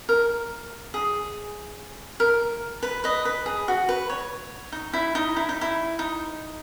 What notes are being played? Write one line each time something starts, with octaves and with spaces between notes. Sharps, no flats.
A#4
G#4
A#4
B4
B4 D#5
B4
G#4
F#4
B4
C#5
D#4
E4
D#4
E4
D#4
E4
D#4